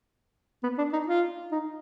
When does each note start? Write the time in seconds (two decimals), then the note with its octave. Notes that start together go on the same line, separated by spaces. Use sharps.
0.63 B3
0.78 D4
0.93 D#4
1.08 F4
1.52 D#4